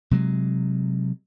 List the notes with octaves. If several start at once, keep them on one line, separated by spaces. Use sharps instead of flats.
C3 F#3 G#3